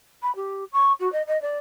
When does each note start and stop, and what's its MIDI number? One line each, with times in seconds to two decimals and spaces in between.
0.22 0.34 83
0.35 0.64 67
0.72 0.92 85
1.00 1.11 66
1.12 1.22 75
1.27 1.40 75
1.42 1.58 74